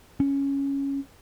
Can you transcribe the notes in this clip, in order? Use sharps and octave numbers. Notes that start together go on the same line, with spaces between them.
C#4